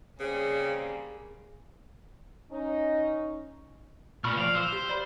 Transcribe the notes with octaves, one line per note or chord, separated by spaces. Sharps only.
C#3 G3 A#3 C4 G#4
C#4 D#4
A#2 B5 C#6 F6
F3 D5 F5
C5 E6 F6
G4
D5 B5